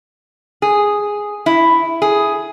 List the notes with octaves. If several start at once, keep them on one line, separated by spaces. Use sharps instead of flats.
G#4
E4
G#4